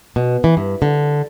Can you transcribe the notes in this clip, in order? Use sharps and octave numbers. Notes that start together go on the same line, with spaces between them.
B2
E3
G2
D3